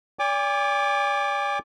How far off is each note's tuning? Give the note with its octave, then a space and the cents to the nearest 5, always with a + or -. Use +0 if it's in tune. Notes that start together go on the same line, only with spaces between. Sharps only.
D5 -40 G#5 -45 D6 +0